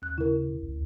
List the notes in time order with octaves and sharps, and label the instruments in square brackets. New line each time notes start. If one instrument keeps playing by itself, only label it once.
[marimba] D#2 F#6
[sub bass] C#3 [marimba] E4 A#4
[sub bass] D2